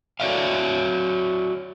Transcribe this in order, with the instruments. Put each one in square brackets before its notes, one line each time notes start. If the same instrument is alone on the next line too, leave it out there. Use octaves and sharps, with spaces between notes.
[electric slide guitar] F#4 C#5 D5 E5 F5